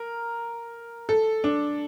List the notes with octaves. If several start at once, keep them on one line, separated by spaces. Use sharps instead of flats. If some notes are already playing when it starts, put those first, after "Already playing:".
Already playing: A#4
A4
D4